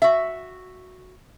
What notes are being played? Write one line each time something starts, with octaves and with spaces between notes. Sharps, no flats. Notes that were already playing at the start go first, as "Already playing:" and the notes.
F#4 E5